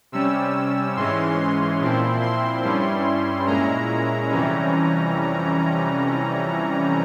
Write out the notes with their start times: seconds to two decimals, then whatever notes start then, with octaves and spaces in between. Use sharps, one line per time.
0.12 C3 G3 C#4 E6
0.97 G#2 E3 G#3 C#4 C6
1.39 C6
1.81 A#2 F3 C4 E4
2.22 C6
2.64 G2 G3 C#4 E4
3.47 A#2 G#3 C#4 E4 A#5
4.31 F2 C3 E3 G3 C#4